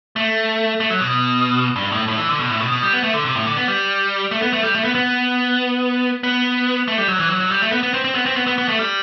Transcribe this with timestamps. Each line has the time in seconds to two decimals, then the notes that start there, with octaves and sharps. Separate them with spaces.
0.16 A3
0.80 A3
0.90 F#3
1.01 B2
1.76 G2
1.92 A2
2.08 A2
2.18 E3
2.29 D3
2.40 B2
2.50 A2
2.61 B2
2.72 B2
2.83 G3
2.93 B3
3.03 A3
3.14 D3
3.25 C3
3.35 A2
3.47 D3
3.57 B3
3.68 G3
4.31 A3
4.42 B3
4.53 A3
4.63 G3
4.75 A3
4.84 B3
4.95 B3
6.23 B3
6.88 A3
6.98 G3
7.08 F#3
7.20 E3
7.30 F#3
7.40 F#3
7.51 G3
7.62 A3
7.72 B3
7.83 B3
7.94 C4
8.04 C4
8.15 B3
8.26 C4
8.36 B3
8.47 B3
8.58 B3
8.68 A3
8.79 G3